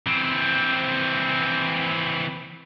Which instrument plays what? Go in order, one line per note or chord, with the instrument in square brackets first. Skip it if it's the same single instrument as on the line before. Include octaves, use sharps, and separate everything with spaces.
[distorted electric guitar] E3 C4